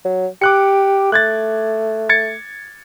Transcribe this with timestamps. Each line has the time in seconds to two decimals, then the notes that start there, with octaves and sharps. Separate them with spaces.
0.05 F#3
0.42 G4 D6 F#6 C#7
1.12 A3 F#6 G#6 A6
2.09 G#6 A6 C#7